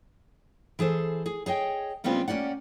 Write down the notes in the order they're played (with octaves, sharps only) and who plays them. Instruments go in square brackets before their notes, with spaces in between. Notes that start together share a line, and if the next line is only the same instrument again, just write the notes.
[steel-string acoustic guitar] E3 G#4 A4 C5
G#4
G#4 C#5 D#5 G5
C#3 G3 G#3 B3 C4 F4
A#3 C#4 G4 D5 F#5